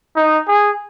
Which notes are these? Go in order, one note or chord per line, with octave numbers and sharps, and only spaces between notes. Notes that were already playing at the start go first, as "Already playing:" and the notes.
D#4
G#4